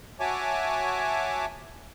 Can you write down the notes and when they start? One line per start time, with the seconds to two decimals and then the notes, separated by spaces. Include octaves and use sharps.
0.20 F#4 C#5 E5 G#5 A5 D6